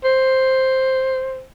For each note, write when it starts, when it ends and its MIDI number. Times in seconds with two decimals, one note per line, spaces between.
0.04 1.44 72